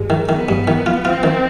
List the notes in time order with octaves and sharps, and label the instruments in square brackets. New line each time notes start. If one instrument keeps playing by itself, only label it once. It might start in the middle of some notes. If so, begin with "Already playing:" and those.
Already playing: [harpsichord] G2 [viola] G#3
[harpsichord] D#3
[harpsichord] D#3 [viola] B3
[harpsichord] G2
D#3
F4
[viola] C4 [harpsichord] F4
[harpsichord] D#3